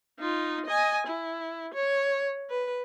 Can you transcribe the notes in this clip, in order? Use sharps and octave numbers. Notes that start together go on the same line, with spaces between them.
D#4 F4
D#5 G#5
E4
C#5
B4